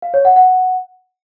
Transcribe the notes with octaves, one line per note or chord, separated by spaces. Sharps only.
F5
C#5
F#5
F#5